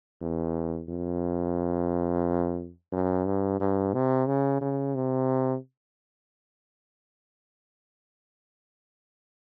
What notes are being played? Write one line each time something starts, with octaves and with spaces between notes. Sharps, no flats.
E2
F2
F#2
G2
G2
C3
C#3
C#3
C3